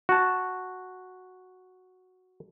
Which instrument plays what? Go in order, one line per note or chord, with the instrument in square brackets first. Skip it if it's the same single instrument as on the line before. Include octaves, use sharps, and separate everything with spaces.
[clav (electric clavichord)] F#4 A5